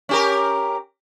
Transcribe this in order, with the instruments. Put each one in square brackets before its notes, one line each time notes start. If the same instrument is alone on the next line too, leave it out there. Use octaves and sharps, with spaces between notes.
[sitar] C#4 G4 A#4